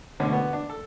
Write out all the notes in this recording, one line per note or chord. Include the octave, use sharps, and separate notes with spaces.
D2 B2 D3 C#4
D3 B3 F#4
D4
A4